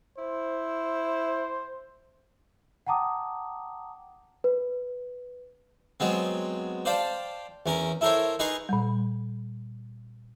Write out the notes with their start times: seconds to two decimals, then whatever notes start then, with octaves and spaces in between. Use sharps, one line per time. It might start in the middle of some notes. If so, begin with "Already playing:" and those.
0.18 E4 C5
2.87 F#5 G5 A5 A#5 D6 D#6
4.44 B4
6.00 F#3 G#3 B3 C4
6.85 C5 D5 F5 G5 A5
7.66 E2 C#4 A#4
8.01 E4 A4 A#4 C5 C#5
8.39 D#4 G#4 B4 A#5 C6 C#6
8.69 A#2 G3